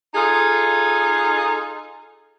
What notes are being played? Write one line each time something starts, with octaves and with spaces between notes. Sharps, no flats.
D#4 F4 G#4 A4